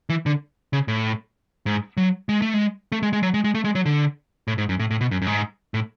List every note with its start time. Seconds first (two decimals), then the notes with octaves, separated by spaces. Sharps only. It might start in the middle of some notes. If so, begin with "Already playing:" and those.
0.09 E3
0.26 D3
0.73 C#3
0.88 A2
1.66 G#2
1.97 F#3
2.29 G#3
2.42 A3
2.54 G#3
2.92 A3
3.03 G#3
3.13 G#3
3.23 F#3
3.34 G#3
3.44 G#3
3.55 A3
3.64 G#3
3.75 F#3
3.86 D3
4.48 A2
4.58 G#2
4.69 F#2
4.79 A2
4.91 A2
5.01 B2
5.11 F#2
5.22 F#2
5.27 G#2
5.74 A2